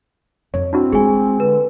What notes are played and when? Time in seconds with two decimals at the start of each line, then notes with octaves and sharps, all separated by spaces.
0.54 F2 C#5
0.73 C4 D4 E4 F#4
0.92 G#3 F4 G#4 G#5
1.40 D3 B4